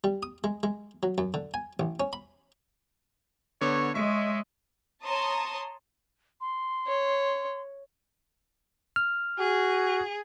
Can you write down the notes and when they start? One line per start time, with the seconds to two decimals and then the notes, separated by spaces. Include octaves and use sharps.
0.04 G3
0.23 D#6
0.44 G#3
0.63 G#3
1.03 F#3
1.18 F#2
1.34 D3
1.54 G#5
1.80 A1
2.00 C#4
2.13 B5
3.61 D3 B3 C#5 D6
3.95 G#3 C#5 D#5 E5 C#6
5.05 C#5 A5 A#5 C6 D#6
6.41 C6
6.87 C#5
8.96 F6
9.39 F#4 G#4